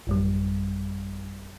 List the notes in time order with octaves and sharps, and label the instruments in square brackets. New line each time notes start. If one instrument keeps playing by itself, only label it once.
[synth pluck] A1 F#2 G3